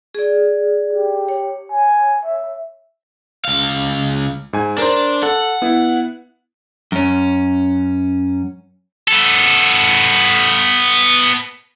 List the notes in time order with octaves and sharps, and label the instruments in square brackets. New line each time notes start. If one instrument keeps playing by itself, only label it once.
[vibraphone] G#4 D5
[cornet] G4
[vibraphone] C#5
[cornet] G#5
E5
[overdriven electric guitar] C#2 F5
[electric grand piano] G#2 G#5
[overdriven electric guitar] D4 [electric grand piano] A#4 C5
[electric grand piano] A4 [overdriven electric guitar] F#5
[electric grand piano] B3 E4
[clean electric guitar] F#2 C#4
[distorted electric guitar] B3 A4